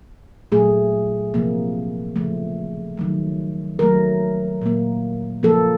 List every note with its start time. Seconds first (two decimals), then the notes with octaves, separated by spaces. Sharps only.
0.52 A#2 F#3 A3 G#4
1.34 C3 F3 A#3
2.16 C#3 F3 A3
2.97 D#3 F#3 A3
3.79 D#3 F#3 A3 A#4
4.62 A#2 F#3 A#3
5.43 C#3 F3 A#3 A4